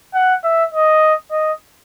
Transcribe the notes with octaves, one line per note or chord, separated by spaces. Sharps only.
F#5
E5
D#5
D#5